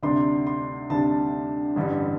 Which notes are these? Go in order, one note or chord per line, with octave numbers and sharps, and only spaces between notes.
D2 C3 G3 D4 C6
C6
D2 C3 G3 D4 A5
A1 G2 D3 G3